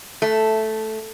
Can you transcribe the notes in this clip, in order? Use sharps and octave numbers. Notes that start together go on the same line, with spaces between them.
A3